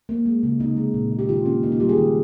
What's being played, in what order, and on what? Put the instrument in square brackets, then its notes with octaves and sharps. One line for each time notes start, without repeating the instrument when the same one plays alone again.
[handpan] A#3
G#3
C#3
C3 D#4
G#3
A#2
G#3
G4
D#3 F4
A#3 C#4
A#3 D#4
F4
G3 G4
G#4
D#3